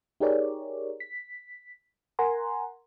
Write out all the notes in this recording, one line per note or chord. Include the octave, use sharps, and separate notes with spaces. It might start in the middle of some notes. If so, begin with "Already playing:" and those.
D#4 G4 G#4 A#4 C#5 D5
B6
A#4 F#5 G#5 A#5 C6